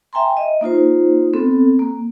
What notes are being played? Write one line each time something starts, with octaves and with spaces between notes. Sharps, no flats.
E5 G5 G#5 A#5 C6
D#5 E5
A#3 D#4 F4 C5
B3 C4 A4
A#3